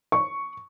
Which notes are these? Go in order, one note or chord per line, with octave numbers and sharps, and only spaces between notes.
C#6